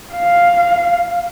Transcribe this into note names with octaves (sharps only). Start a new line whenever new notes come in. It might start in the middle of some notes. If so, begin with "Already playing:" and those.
F5